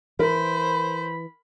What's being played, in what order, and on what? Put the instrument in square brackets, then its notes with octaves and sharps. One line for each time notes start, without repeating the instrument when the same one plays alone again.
[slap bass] E3 [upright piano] A#4 [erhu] C5 [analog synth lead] B5